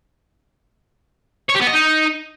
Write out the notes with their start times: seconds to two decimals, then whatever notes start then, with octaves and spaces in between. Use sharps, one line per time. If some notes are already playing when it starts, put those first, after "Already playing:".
1.50 C#5
1.56 G4
1.62 B3
1.68 D#5
1.73 D#4